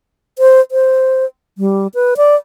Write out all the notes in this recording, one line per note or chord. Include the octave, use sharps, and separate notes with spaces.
C5
C5
G3
B4
D5